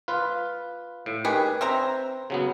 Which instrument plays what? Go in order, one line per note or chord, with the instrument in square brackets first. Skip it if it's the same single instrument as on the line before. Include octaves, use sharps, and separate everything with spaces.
[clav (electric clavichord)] F4 B4
A2
[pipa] D#3 G4 G#4 [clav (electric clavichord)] B4
[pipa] C4 E5 A#5
[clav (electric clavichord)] C#3 F#3 B3